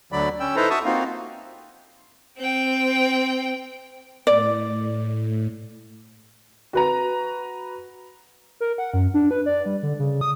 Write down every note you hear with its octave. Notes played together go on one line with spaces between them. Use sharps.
D2 D3 F#3 D5 B5
C#4 G5 E6
D#4 E4 A4 B4 C5 A#5
F#4 E5 A5 C#6 D#6
A#3 C4 D#4 F4 F#4 F5
C4 G5
A2 D5
F#4 B4 A#5
A#4
F#5
F#2
D4
B4
D5
G3
D3
C#3
D#6